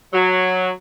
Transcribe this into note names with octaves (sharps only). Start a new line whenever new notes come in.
F#3